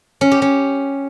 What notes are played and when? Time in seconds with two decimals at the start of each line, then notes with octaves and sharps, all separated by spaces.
0.21 C#4
0.31 G4
0.42 C#4